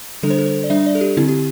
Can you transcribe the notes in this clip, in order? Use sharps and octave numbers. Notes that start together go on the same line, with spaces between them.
D3 G3 D4 A4
C5
A4
C5
D5
G3 D4 E5
D5
A4
G4
D3 C4 E4
G4